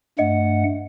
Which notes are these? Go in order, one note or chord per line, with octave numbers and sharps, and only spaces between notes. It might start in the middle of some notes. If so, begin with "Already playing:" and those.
G2 A3 D#5 F#5